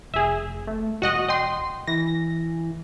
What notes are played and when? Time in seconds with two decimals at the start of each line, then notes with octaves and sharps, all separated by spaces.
0.14 F1 G#4 E5
0.67 A3
1.02 E1 F#4 D#5 F#5
1.28 D#5 G5 C6
1.87 E3 A#6